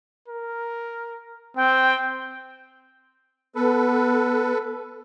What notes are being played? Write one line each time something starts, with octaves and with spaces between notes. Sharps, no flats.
A#4
C4 G5
B3 A4 B4